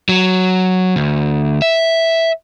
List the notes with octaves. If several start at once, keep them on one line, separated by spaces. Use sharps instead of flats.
F#3
D2
E5